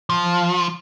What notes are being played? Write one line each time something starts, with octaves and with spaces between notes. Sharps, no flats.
F3